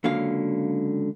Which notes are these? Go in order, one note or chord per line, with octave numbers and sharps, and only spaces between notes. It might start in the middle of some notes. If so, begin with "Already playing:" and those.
C#2 D3 F#3 A#3 F5